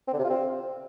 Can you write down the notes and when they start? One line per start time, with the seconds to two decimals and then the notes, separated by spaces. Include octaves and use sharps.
0.08 C4
0.13 D3
0.19 C3
0.25 F4
0.30 C4